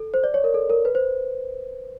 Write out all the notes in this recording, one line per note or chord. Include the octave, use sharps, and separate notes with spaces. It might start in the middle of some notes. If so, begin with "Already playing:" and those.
Already playing: A4
C5
D5
C#5
A#4
A4
A#4
B4
C5